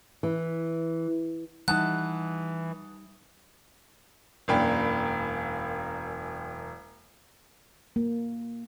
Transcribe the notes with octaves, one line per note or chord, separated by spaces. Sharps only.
E3
E3 G3 D#4 F#5 A5 D#6 F#6
E1 F#2 A#3 D4 G5 B5
A#3